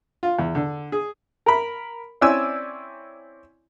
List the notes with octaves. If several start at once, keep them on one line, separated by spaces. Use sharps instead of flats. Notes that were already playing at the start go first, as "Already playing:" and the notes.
F4
E2
D3
G#4
A#4 B5
C4 C#4 E4 D5 G#5 E6